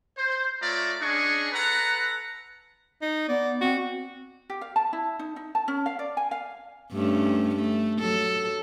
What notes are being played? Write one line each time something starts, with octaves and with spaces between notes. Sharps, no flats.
C5
A3 F4 C#5 D5 E5 A#5
C#4 D4 G#4 D#5 G#5 C#6
A4 B4 F#5 A#5
D#4
B3 D5
C4 F#4
G4
F5
A5
E4
D#4
D#4
A5
C#4
F5
D5
G#5
F5
G2 A3 C#4
A3
F#3 A4